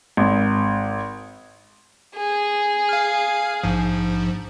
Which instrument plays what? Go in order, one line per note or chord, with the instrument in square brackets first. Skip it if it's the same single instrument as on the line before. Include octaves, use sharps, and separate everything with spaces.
[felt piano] G#1
[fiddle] G#4
[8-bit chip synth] F5 F6
A#1 G#2 F3